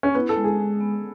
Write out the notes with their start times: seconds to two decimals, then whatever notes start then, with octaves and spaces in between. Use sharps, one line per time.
0.03 C#4
0.15 B3 E4
0.29 A4
0.36 G#3
0.44 G#4
0.60 G#3
0.81 B3